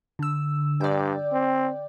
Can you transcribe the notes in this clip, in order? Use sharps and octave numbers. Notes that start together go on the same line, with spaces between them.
D3 E6
G2 D5 G5
C4